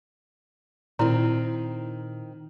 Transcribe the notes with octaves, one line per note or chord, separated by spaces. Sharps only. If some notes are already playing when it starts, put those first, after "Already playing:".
A#2 D#3 C4 E4 A#5